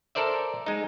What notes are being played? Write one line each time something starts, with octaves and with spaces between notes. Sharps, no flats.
A4 A#4 C5 D5 E5
G#3 D#4